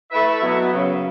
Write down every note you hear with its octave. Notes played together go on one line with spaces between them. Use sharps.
A3 E4 B4 E5
B2 F#3 B3
F#2 C#3 F#3